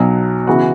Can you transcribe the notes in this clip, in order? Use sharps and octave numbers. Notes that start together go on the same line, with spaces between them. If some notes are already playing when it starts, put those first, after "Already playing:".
Already playing: B1 B2 F#3
C#3 E3 B3 F#4